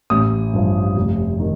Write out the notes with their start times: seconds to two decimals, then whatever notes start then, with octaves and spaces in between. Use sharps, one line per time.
0.10 A1 D#6
0.53 G2 F3
0.96 F1
1.40 D#3